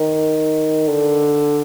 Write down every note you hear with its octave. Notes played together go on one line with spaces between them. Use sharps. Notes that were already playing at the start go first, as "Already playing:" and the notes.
Already playing: D#3
D3